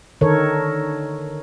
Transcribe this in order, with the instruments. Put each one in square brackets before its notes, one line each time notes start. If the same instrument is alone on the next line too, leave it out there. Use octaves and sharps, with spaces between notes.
[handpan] D3 D#3 A4 A#4 C#5